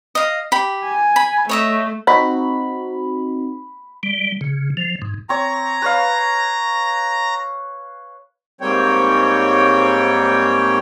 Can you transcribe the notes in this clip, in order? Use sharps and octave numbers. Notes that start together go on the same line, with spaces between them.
D#5 F5
G4 B5
G#5
B5
A3 C#5 D#5 E5
C4 D#4 F#4 B5
G3
C#3
F3
G#2
C4 C#5 A#5
B4 C#5 F5
G#2 G3 A#3 C4 C#5 G5